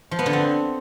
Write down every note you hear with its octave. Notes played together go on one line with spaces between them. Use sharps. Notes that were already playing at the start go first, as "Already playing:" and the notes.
F3
B3
D3
C4